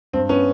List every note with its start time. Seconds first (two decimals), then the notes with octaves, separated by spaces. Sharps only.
0.13 G2 C4
0.29 B3 C#4